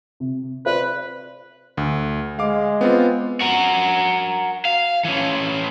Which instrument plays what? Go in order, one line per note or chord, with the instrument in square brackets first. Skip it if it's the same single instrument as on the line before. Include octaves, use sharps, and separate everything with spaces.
[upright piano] C3
[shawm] B4 [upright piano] C5 D5
[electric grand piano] D2
[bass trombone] G#3 [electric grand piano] F5 D6
[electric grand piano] B3 C4 F4
[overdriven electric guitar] F#4 A#4
F5
E3 C#4